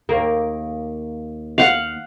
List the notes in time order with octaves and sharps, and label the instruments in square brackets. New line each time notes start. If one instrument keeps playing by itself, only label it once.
[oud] D#2 A#3
[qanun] F5 F#5